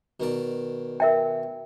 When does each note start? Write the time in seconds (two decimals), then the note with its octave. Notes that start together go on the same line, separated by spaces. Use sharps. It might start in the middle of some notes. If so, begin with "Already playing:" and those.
0.20 B2 D#3 D5
1.00 A#4 E5 G5